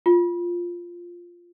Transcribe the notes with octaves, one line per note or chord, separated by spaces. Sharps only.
F4